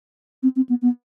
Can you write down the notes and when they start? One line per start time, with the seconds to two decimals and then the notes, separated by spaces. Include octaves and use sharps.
0.43 C4
0.56 C4
0.69 B3
0.82 B3